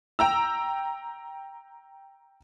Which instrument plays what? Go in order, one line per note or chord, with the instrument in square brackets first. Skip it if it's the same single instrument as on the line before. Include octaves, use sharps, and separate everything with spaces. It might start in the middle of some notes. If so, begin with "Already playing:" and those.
[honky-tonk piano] G5 A#5 E6